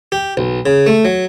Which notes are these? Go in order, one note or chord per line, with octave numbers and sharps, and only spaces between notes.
G4
B1
C#3
A3
F#3